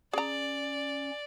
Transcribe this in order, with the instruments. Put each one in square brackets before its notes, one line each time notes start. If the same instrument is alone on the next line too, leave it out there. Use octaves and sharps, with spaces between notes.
[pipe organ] C#4 [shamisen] G#4 A#5 [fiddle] D5